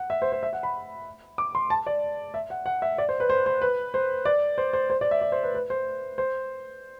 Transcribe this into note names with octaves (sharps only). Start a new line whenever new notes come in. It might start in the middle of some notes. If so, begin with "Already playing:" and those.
Already playing: F#5
E5
C5
C5
E5
F#5
B5
D6
C6
A5
D5
E5
F#5
F#5
E5
D5
C5
B4
C5
C5
B4
C5
D5
C5
C5
C5
D5
E5
D5
C5
B4
B4
C5
C5